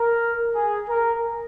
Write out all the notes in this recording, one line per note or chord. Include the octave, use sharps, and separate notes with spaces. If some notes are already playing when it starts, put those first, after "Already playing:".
Already playing: A#4
G#4
A#4